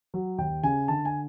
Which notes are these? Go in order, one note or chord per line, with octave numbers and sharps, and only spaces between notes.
F#3
D#2 G5
C#3 G#5
D3 A5
G#5